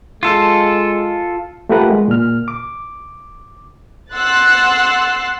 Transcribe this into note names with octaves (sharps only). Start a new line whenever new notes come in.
G#3 F4 A4
A3 F4 G4 A#4 B4 F#5
G#3
A#2 F6
D6
F#5 C6 E6 F#6 A6